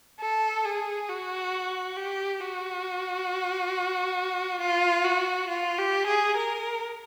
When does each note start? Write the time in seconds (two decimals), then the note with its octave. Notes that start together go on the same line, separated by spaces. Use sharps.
0.20 A4
0.64 G#4
1.08 F#4
1.96 G4
2.40 F#4
4.61 F4
5.04 F#4
5.48 F4
5.78 G4
6.06 G#4
6.37 A#4